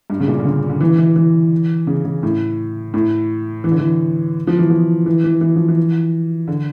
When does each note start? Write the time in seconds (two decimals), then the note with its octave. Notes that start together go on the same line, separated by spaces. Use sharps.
0.10 G2
0.20 C#3
0.28 A#2
0.39 D3
0.45 C#3
0.69 D3
0.81 E3
0.98 E3
1.16 E3
1.87 C#3
2.05 C#3
2.23 A2
2.94 A2
3.64 E3
3.72 D3
3.79 E3
4.47 F3
4.59 E3
4.70 F3
5.06 E3
5.24 E3
5.41 E3
5.56 F3
5.68 E3
6.48 D3